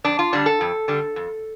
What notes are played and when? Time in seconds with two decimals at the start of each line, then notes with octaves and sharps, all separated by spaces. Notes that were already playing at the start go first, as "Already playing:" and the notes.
0.04 F2 D4
0.19 F4
0.33 D3 G3 D4
0.46 A4
0.61 F2
0.88 D3 G3
1.16 F2